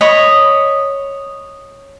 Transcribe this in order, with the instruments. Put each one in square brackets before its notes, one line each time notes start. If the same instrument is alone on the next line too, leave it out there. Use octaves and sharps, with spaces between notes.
[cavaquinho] C#5 D#5 B5